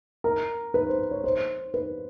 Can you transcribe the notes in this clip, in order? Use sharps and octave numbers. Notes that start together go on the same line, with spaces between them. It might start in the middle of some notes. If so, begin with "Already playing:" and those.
A#4
B4
C5
C#5
C5
B4